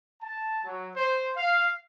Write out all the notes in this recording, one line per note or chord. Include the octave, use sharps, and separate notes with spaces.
A5
F#3
C5
F5